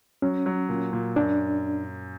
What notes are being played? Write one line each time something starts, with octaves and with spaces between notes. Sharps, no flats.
F#3 C#4
F#3
A#2
A#2
F#2 D4